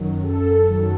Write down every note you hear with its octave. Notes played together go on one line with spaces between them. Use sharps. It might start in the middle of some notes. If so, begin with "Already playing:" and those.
Already playing: F#2 D#3 F#3
F#2 A4
D#3 F#3